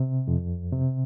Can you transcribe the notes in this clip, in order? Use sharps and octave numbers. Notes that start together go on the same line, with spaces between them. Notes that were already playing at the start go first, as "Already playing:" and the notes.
Already playing: C3
F2
C3